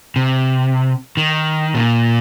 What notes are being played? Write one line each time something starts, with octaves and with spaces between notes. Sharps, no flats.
C3
D#3
A#2